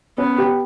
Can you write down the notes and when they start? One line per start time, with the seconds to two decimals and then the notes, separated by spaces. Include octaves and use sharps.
0.18 B3 C#4
0.38 G4